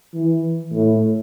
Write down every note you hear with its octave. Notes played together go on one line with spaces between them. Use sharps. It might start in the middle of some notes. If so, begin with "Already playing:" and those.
E3
A2